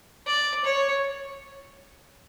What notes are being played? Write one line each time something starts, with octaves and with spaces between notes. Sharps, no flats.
D5
C#5